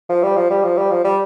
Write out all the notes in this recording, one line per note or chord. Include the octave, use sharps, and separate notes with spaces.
F3
G3
F3
G3
F3
G3
F3
G3